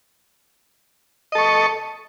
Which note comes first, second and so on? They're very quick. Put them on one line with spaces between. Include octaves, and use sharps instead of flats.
D#5 A4 C#6